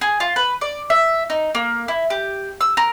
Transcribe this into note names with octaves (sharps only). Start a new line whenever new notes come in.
G#4
F4
B4
D5
E5
D#4
A#3
E4
G4
E6
A#4